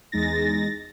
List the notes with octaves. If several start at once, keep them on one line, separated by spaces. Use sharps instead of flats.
E2 G#3 D#4 A6 A#6